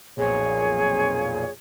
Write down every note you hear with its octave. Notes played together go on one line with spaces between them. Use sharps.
B1 F2 A#2 G#4 C#5